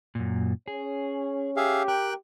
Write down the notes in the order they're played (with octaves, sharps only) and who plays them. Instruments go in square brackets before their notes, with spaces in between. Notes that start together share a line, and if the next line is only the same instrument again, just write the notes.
[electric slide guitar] F#2 A#2
[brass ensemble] C#4 C#5 [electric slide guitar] G#4
[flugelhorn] G4 [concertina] G#4 E5 F5
[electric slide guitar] A#4 [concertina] G5 F#6